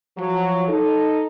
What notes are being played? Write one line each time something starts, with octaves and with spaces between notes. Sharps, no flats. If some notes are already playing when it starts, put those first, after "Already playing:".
F3 F#3
D#4 A4